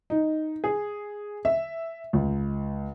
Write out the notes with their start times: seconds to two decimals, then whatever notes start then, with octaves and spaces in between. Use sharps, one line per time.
0.10 D#4
0.64 G#4
1.45 E5
2.13 C#2